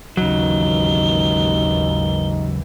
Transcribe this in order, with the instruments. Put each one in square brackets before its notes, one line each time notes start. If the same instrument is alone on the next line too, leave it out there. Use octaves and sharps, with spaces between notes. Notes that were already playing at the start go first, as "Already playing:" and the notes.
[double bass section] G#1 D#2 E3 [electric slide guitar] C#3 F#3 [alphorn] D#4 [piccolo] G7